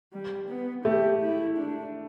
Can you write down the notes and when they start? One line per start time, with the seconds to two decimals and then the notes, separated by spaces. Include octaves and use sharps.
0.13 G3
0.49 B3
0.85 A3 G4
1.22 E4
1.58 D4